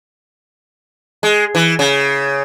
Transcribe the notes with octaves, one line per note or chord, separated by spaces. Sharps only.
G#3
E3
C#3